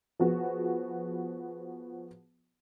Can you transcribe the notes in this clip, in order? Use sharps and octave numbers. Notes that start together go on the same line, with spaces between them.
F3 B3 F#4 G#4